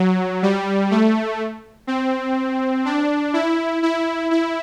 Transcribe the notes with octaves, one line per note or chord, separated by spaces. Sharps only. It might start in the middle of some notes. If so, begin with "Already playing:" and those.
Already playing: F#3
G3
A3
C4
D4
E4
E4
E4